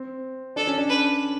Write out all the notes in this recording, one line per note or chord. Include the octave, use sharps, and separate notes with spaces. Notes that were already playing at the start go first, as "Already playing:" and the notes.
Already playing: C4
D4 A4
C#4
D4
B4